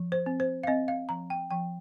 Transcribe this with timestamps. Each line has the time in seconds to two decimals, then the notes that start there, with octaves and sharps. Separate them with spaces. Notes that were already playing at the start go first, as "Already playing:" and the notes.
Already playing: F3
0.12 C5
0.26 C4
0.40 C5
0.63 F5
0.67 C4 D#5
0.88 F5
1.09 F3 A#5
1.30 G5
1.51 F3 G5